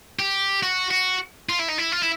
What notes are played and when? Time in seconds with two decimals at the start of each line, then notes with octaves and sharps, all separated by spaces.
0.19 G4
0.63 F#4
0.91 F#4
1.49 F4
1.59 E4
1.68 D#4
1.78 E4
1.92 F4
2.02 E4